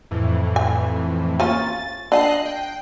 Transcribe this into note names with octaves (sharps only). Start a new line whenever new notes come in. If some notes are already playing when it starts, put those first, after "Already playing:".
F2 A2 E3
G#5
A#3 C#4 F4 A6
D4 D#5 F#5 A5 F#6 C7
G5